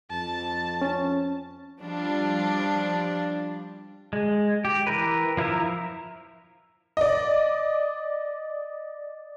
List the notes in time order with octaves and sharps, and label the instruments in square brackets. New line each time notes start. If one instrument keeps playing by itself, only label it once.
[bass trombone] F2 [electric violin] A5
[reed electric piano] C#4
[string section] F3 G3 D4 F4
[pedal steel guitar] G#3
G4
E3 A#4 B4
F3 E4 A#4 E5 A#5
[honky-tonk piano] D5 D#5